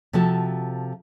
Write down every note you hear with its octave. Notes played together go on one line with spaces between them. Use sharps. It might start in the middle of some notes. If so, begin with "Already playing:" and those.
C3 F3 F#4 A4 A5